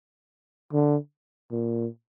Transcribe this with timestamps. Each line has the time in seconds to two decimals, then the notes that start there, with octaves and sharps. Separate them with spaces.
0.73 D3
1.51 A#2